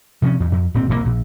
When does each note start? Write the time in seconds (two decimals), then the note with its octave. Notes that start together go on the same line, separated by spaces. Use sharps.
0.22 C3 F3 C4 C#4
0.40 E2
0.52 F2
0.74 D1 A#2 C4
0.89 E1 C2 C3 A#3
1.05 A#1